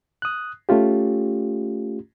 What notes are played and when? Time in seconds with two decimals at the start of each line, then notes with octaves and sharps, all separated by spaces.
0.22 D#6 F#6
0.69 A3 C#4 F4 G4